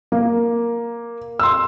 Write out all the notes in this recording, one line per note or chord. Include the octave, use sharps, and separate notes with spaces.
A#3
C6 E6